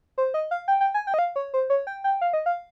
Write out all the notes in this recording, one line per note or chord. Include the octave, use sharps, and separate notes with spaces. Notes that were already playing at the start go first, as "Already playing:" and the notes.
C5
D#5
F5
G5
G5
G#5
G5
D#5
F5
C#5
C5
C#5
G5
G5
F5
D#5
F5